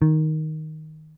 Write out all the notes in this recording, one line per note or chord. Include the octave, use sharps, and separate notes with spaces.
D#3